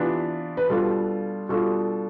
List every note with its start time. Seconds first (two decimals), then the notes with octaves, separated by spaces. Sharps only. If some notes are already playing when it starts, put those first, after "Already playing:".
Already playing: C3 E3 B3 D4 F4
0.57 B4
0.70 B2 G3 D4 F4 A4
1.49 B2 G3 D4 F4 A4